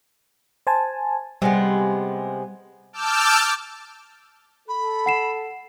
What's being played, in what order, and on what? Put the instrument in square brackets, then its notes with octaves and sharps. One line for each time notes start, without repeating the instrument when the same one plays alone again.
[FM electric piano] C5 G#5 A5
[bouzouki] C3 G#3 B3 [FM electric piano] G3
[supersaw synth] A5 D6 E6 F6 G6
[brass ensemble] A4 [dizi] B5
[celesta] F#5 C7 E7